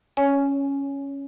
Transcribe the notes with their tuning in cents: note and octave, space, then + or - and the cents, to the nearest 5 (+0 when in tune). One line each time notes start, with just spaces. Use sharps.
C#4 +0 C#5 +20 G#5 +10